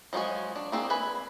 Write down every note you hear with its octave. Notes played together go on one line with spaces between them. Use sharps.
F3 F#3 G#3 C#5 G#5
D4
A#3 C4 D4 G#4
B4 G#5 B5